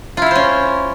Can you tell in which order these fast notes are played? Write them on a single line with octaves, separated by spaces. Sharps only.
F4 E4 F5 C5 C#4